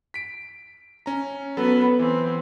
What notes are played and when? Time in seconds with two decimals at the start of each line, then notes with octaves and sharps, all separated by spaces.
0.14 B6 D7
1.06 C#4 A#5
1.57 F#3 B3 A4 B4
1.99 E3 C4